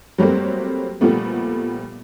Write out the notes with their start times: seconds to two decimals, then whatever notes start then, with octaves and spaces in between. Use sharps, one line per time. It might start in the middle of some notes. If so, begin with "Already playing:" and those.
0.18 F#3 G3 A3 A#3 C4
1.01 A#2 F3 G3 A3 B3